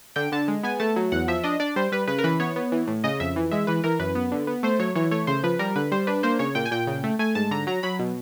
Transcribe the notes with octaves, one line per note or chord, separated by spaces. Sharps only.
D3 G5
D3 A5
G#3
B3 G#5
A3 A5
F#3
E2 F#5
F3 E5
D4 D#5
D4 D5
G3 C5
G3 B4
C#3 B4
A#4
E3 B4
B3 C#5
B3
E3
A2
C#3 D#5
F2 E5
E3
G#3 E5
E3 B4
E3 A#4
F#2 B4
B3
D3
B3
A3 C5
F#3 C#5
E3 C#5
A3 C#5
C#3 C5
F3 B4
G3 A#4
D3 B4
G3 C5
D4 B4
A#3 C5
C#3 C#5
A#2 G5
G#5
A#2 G5
C#3
A3
A3 G#5
G#2 A5
D3 A#5
F#3 A#5
F#3 B5
B2